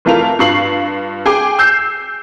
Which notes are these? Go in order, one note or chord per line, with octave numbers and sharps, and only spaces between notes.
F1 E3 A3 F4 A#4 F7
G2 F4 C#6 C7 F#7
G#4 G5 G#5 D6
E6 G6 C7